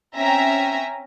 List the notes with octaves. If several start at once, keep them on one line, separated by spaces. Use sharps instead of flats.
C4 C#4 E5 G5 G#5 A#5